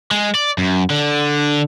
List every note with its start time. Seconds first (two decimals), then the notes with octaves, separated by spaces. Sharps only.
0.11 G#3
0.35 D5
0.58 F#2
0.91 D3